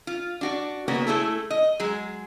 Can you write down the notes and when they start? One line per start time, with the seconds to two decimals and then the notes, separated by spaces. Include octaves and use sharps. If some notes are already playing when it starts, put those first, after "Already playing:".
0.07 F4
0.41 D4 F#4 D5
0.88 C#3 A#3 B3 F#4 C#5
1.07 A3 E4 G#4 A4
1.50 D#5
1.80 F#3 G#3 G#4